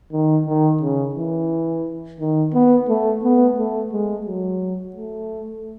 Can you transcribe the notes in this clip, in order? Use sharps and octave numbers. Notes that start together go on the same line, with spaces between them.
D#3
D#3
C#3
E3
D#3
B3
A3
B3
A3
G#3
F#3
A3